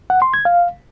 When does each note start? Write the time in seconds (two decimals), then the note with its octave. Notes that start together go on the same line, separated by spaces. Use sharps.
0.10 F#5
0.22 C6
0.34 G#6
0.45 F5